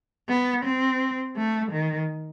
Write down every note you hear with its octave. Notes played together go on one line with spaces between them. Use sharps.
B3
C4
A3
D#3